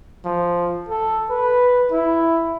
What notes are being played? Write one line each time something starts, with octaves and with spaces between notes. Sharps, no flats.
F3
A4
B4
E4